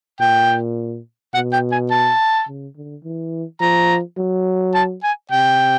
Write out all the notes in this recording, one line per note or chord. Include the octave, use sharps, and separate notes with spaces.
A#2 G5
B2 F#5
G5
G#5
A5
C#3
D3
E3
F3 A#5
F#3
A5
G#5
C3 G5